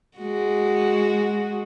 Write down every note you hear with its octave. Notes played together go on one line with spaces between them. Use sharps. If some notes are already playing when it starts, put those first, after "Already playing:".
G#3 F#4